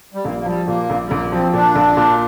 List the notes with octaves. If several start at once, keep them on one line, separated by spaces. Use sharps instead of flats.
G3
A#1 A#3
A#3
F3 G3
A#2 A#3
A#1
G3
A#1 A#3
F3 C4
A#2 D4
A#1
A#2